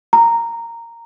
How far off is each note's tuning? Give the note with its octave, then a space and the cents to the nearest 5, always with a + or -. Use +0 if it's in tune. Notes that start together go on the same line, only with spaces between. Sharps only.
A#5 -10